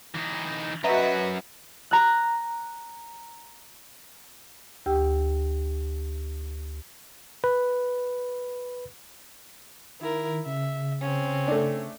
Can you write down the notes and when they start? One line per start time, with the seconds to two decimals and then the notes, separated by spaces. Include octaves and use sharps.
0.15 E3 D#4
0.84 F#2 F#3 F#4 B4 D#5 E5 A#5
1.91 A#5 F#6
4.86 D2 G4 G5 E6
7.44 B4
10.00 D#3 E4 A#4
10.46 C#3 E5
11.01 C4 C#4
11.48 A3 D4